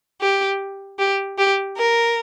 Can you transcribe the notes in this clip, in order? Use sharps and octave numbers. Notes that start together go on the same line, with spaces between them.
G4
G4
G4
A#4